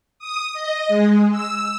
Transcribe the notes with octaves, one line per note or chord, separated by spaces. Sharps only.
D#6
D#5
G#3
E6